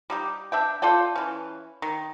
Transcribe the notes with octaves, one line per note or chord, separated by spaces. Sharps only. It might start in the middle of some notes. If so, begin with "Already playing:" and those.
G3 D#4 G4
D4 E5 G5
F4 A4 D5 G5
E3 C#4
D#3